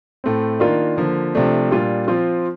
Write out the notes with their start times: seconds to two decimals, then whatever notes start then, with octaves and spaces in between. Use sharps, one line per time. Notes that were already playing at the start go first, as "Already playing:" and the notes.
0.24 A2 A3 C4
0.60 D#3 A#3 D4 F4
0.97 D3 F3 A#3
1.35 C3 F3 A3 D4
1.71 A#2 G3 D4 F4
2.08 F3 C4 F4